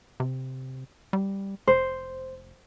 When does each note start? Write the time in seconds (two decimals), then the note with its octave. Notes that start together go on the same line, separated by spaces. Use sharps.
0.20 C3
1.13 G3
1.67 F1 C5